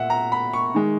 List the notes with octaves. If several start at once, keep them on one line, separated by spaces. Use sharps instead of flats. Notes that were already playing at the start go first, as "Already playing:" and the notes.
Already playing: A#2 E5 F#5
A#5
B5
C#6
D#3 G#3